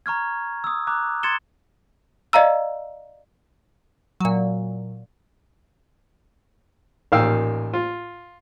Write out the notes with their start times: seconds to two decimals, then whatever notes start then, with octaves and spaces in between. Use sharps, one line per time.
0.06 A#5 C#6 F6 G#6
0.64 D#6 E6
0.87 A#5 D6 F#6
1.23 C6 G#6 A6 C#7 E7 G7
2.33 D5 D#5 F5 A#5 E6
4.20 A#2 F#3
7.12 A1 A#2 D#3 F5 G5 E6
7.73 F4